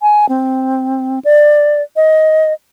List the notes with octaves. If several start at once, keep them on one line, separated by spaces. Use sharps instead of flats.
G#5
C4
D5
D#5